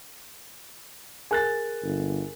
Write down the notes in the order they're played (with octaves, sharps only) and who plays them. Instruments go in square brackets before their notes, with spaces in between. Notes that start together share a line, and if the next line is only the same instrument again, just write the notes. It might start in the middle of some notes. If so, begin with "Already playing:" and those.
[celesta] G#4 A#4 [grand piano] G#5 F#6 A6
[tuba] G1